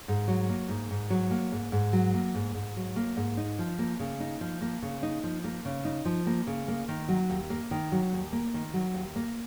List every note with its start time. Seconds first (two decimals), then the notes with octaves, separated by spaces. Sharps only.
0.08 G#2
0.28 F#3
0.49 A#3
0.69 G#2
0.91 G#2
1.10 F#3
1.31 A#3
1.52 G#2
1.72 G#2
1.93 F#3
2.14 A#3
2.35 G#2
2.55 G#2
2.76 F#3
2.96 A#3
3.17 G#2
3.37 D#4
3.59 F3
3.79 A#3
4.00 C#3
4.20 D#4
4.41 F3
4.61 A#3
4.82 C#3
5.03 D#4
5.24 F3
5.44 A#3
5.65 C#3
5.85 D#4
6.05 F3
6.27 A#3
6.47 C#3
6.68 A#3
6.88 D#3
7.08 F#3
7.30 D#2
7.50 A#3
7.71 D#3
7.92 F#3
8.13 D#2
8.33 A#3
8.54 D#3
8.74 F#3
8.94 D#2
9.16 A#3